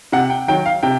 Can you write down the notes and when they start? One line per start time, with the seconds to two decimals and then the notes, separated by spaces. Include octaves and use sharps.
0.12 C3 F#5
0.30 G5
0.48 D#3 F#3 G5
0.66 F5
0.83 C3 G5